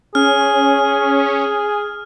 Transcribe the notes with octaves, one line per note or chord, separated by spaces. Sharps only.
C#4 G#4 F6